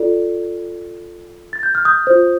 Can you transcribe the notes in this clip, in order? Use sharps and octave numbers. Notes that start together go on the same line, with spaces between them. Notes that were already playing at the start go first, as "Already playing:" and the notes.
Already playing: F4 A4 D5
A6
G6
F6
D#6 G6
F4 C5